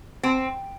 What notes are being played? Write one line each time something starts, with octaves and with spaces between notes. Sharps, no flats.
C4